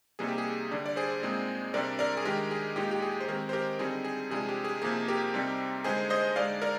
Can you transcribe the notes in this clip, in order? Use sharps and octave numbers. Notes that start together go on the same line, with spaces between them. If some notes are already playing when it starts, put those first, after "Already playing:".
C3 G3 A#3 D#4 G#4
G4
G#4
D3 G3 D4
D5
G#4 C5
A#2 G#3 C4 D#4
C3 G3 D4 A#4 D5
A#4 D5
G#4
D#3 G#3 D4 G4 A#4
G#4
A#2 G#3 D#4 G4
G4
G#4
C5
D#3 G#3 C4 G4 A#4
C5
G4 A#4
D3 G3 C4 D#4 G#4
G#4
C3 F3 G#3 D4 G#4
G4
G#4
C3 F3 A#3 D#4 G#4
G4 A#4
C3 G3 C4 D#4
D3 G#3 D#4 G#4 C5
C5 D#5
D3 G#3 D#4 D5 F5
A#4 D5